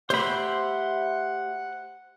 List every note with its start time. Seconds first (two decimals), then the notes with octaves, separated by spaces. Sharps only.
0.10 A3 G4 C5 E5 F#5 B5